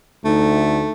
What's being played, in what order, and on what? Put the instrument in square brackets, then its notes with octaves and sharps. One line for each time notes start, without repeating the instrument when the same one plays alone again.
[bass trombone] D2 [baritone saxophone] A3 [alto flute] D#4